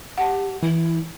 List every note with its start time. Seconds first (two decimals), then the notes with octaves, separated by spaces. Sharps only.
0.18 G4 F#5 A5
0.63 E3 E4